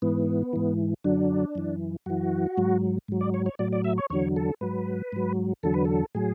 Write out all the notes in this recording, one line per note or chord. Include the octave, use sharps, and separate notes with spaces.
G#2 E3 B3
G#2 E3
F#2 D3 F#3 D4
F#2 E3
F#2 E3 F#4
G#2 F#3
G#2 F#3
D5
C#5
C#5
A2 F#3 D5
D5
E5
C#5
E2 D3 F#3 C#5
A4
G#2 F#3 B4
G#2 F#3
E2 D3 F#3 A4
B4
A4
A2 F#3 G#4